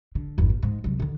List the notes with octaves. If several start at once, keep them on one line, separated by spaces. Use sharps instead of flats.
D3
G1 E2
A#2
G#2 G#3
C2 F#3
D3 D#3